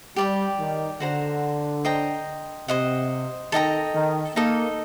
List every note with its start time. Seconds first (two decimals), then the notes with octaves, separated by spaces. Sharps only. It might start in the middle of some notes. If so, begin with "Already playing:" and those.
0.16 G3 G4 D5 G5
0.59 D#3
1.00 D3 F#4 C5 F#5 A#5
1.85 C5 D#5 G5 A#5
2.68 C3 C5 D#5 F#5
3.52 D#3 A4 D#5 G5 A#5
3.94 D#3
4.36 A#3 D#4 A4 D#5